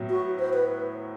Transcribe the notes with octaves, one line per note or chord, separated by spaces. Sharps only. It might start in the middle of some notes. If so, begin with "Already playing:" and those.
Already playing: A2 F#3 B3
F#4
C5
B4